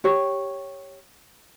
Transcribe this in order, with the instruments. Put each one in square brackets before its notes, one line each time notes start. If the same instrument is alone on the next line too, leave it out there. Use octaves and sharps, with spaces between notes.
[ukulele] G4 C#5